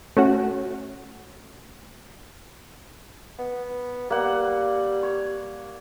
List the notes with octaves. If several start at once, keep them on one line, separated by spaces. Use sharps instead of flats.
A3 C#4 F#4
B3
G3 A#3 F#5
C#5